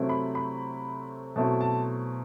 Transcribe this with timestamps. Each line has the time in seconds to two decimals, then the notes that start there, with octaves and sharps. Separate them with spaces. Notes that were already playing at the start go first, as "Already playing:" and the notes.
Already playing: C3 F#3 A3 C4 E4
0.09 B5
0.35 B5
1.36 B2 F#3 A3 C4 E4 A5
1.61 A5